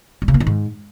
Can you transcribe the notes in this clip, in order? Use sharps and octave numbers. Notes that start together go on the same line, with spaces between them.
G3
C#3
A#3
D#3
G#2